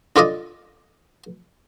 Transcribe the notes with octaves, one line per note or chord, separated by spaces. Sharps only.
D4 F4 A4 D5 D#5